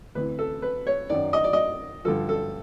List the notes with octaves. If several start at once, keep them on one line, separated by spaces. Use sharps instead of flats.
D2 C3 E3 B4
A4
B4
C#5
F#2 D#3 D5
D#5
D5
D#5
G2 D3 F3 A4
A4